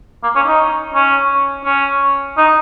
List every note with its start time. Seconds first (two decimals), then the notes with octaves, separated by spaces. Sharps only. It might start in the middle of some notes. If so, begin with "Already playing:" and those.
0.23 A#3
0.36 C#4
0.47 D#4
0.94 C#4
1.65 C#4
2.37 D#4